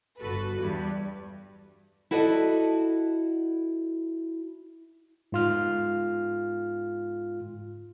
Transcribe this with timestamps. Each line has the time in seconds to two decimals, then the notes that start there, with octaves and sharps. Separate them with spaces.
0.20 G1 F#4 A4 B4
0.60 E2 G2 G3
2.11 E4 F#4 A4 D5 D#5
5.32 G#2 F4 F6